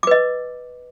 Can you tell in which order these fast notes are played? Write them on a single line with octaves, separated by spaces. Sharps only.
D6 B4 D#5